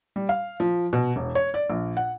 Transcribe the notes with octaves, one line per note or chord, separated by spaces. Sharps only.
G3
F5
F3
B2
E1
C#5
D5
A#1
F#5